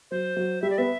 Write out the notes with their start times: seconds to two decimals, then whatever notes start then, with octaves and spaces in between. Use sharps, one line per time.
0.11 F#3 C5
0.36 F#3
0.62 G3 E5
0.70 D5
0.78 B3 E5